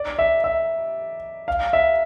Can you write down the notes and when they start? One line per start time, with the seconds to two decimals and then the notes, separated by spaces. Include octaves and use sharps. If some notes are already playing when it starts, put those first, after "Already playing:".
Already playing: D5
0.19 E5
0.44 E5
1.48 F5
1.73 E5